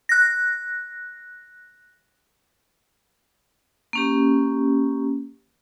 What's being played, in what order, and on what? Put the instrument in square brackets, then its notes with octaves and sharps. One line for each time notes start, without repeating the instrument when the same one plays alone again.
[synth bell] F#6 A#6
[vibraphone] A#3 C#4 G4